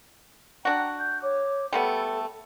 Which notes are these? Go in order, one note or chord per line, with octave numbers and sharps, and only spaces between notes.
D4 F#4 G5 A#5
G6
C#5 D6
G3 A3 B3 A4